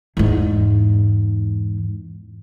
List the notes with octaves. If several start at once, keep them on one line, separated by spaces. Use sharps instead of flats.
E2 G#2